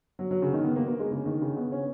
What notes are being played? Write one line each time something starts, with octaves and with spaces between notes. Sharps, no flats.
F#3
F#3
C#3
D#3
B3
A#3
A#3
G#3
C#3
D#3
C#3
B3
C#4